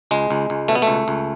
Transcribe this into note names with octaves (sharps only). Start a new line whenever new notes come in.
C#2 G#3
C#2
C#2
B2 A3
B3
A3
C#2
C#2